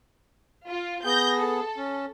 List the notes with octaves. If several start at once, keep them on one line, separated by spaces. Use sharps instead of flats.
F4
B3 G#4 G6 A#6
A4
C#4